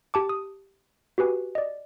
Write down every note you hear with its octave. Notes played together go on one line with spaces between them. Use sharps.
G4 A5 D6
D#6
F#4 G4 B4 G#5
D5 D#5